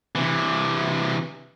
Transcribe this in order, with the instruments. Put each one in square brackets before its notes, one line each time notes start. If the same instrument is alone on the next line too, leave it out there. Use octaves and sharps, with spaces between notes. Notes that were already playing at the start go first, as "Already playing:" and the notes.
[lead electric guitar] C3 E3